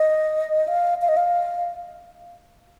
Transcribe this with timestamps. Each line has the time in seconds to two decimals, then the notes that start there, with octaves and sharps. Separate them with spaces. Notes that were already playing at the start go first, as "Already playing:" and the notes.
Already playing: D#5
0.68 F5
1.02 F5
1.09 D#5
1.17 F5